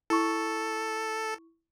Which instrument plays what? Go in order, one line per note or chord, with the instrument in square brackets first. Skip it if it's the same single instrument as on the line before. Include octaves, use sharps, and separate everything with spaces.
[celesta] E4 C#6 [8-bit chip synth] A4